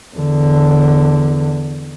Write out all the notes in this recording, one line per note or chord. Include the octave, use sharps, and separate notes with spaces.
E2 D3